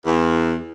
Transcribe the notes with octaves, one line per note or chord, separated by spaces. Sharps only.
E2